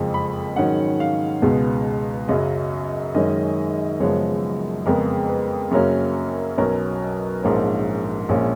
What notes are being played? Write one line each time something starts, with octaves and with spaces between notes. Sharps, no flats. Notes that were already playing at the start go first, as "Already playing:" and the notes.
Already playing: F#1 F2 F3 G#3
B5
G#2 D#3 F#3 C#4 F#5
F5
C#2 B2 G#3 B3
F#2 C#3 F#3 D#5
F#2 D#3 G#3 C#4 D#5
F#1 F#2 F3 G#3 B3 C#5
F2 C#3 G#3 B3 A#4
B4
F#2 C#3 F#3 A#3 C#4 A#4
B1 B2 F#3 C#4 A#4
A#1 G#2 F3 A#3 C#4 A#4
A#1 A#2 F3 G#3 C#4